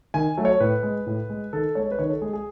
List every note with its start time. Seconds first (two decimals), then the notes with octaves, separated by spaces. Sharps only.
0.14 D#3 G#5
0.37 F#3 A3
0.45 C#5
0.60 A2 B4
0.83 G#3
1.06 A2
1.30 G#3
1.53 D#3 A4
1.75 G#3 C#5
1.91 B4
1.99 D#3 C#5
2.10 A4
2.21 G#3 G#4
2.33 G#4